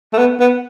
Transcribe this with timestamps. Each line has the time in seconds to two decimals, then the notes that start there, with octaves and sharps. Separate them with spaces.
0.13 A3
0.18 B3
0.40 B3